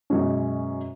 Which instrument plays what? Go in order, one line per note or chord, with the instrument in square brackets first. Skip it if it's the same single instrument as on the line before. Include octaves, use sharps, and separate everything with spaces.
[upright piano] F#2 B2 G#3 C#4